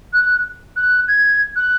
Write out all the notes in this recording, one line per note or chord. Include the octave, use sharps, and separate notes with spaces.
F#6
F#6
G#6
F#6